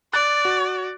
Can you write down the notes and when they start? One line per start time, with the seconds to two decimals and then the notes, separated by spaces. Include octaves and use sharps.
0.14 D5 F#6 A6
0.45 F#4